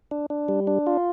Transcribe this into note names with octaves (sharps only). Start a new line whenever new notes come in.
D4
D4
G3
D4
F4